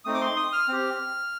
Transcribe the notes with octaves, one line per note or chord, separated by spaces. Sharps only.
A3 C4 D#4 D#6
D6
C6
D#6
F6
C4 G4